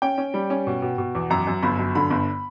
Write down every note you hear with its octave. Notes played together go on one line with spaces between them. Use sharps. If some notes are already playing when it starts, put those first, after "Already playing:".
C#4 G5
C#4
G3
C#4
B2
B2
B2
E2
F#2 A#5
F#2
G1 B5
F#2
D3 B5
G1